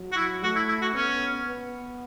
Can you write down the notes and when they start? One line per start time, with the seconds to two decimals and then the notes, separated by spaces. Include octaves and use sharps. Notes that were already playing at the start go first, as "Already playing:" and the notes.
Already playing: F#3
0.12 F#4
0.16 E4
0.43 A3 F#4
0.56 E4
0.68 E4
0.81 F#4
0.95 B3 C#4
1.46 B3